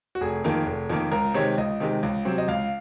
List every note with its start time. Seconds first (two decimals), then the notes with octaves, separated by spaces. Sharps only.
0.15 F#4
0.21 F1 G#4
0.44 F2 D#3 A#3
0.66 F1
0.90 F2 D#3 A#3
1.12 C#2 A#4
1.34 C3 D#3 G#3 C#5
1.58 C#2 D#5
1.80 C3 D#3 G#3
2.03 C#2
2.25 C3 F#3 C4
2.38 D#5
2.48 C#2 F5